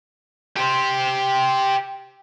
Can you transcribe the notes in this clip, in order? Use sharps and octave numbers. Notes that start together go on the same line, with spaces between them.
G4 C5